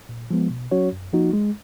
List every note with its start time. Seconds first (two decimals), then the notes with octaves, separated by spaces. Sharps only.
0.09 A#2
0.31 F3 G#3 B3
0.50 B2
0.71 F#3 C#4 F#4 C#5
0.92 F#2
1.13 F3 A#3 D#4 F#4
1.34 G#3